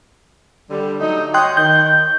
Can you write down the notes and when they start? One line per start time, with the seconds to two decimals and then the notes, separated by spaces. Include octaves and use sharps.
0.70 D3 G3
1.00 F#3 A3 D#4
1.34 C#5 D#5 G5 C6 F#6
1.57 D#3 G6